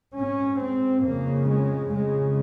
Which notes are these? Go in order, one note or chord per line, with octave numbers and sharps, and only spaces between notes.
G#2 C#4
C4
F2 C#3 A#3
G#3
F2 C#3 G#3